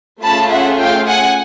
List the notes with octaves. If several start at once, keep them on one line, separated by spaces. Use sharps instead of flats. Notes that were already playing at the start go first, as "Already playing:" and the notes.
A3 C#4 F4 G#4 A5 B5
E5 F#5
F5 G5
F#5 G#5